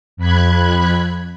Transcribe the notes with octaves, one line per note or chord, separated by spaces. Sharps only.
F2 B5 F#6 G#6